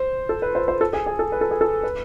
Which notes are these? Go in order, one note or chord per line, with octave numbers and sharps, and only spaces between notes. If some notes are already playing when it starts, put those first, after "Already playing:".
Already playing: C5
A4
B4
C5
C5
A4
G#4
G#4
A4
B4
A4
G#4
A4
B4